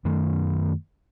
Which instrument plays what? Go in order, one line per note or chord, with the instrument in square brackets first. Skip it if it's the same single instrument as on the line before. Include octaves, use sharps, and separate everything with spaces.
[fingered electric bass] F#2 D#3 A3